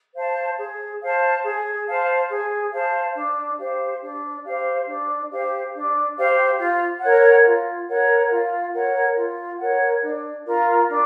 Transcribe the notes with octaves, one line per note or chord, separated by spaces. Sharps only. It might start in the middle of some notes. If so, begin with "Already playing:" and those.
C5 F5 A5
G#4
C5 F5 A5
G#4
C5 F5 A5
G#4
C5 F5 A5
D4
G4 C5 F5
D4
G4 C5 F5
D4
G4 C5 F5
D4
G4 C5 F5
F4
A#4 C#5 F#5
F4
A#4 C#5 F#5
F4
A#4 C#5 F#5
F4
A#4 C#5 F#5
D4
F4 A#4
D4